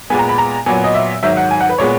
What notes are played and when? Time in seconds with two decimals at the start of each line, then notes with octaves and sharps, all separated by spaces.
0.10 A#2 G#3 B3 G#5
0.19 A#5
0.29 B5
0.38 A#5
0.66 A#2 F#3 B3 G#5
0.84 D#5
0.94 E5
1.23 G#2 D#3 F#3 E5
1.37 F#5
1.51 G#5
1.61 F#5
1.70 B4
1.78 A#2 G#3 B3 C#5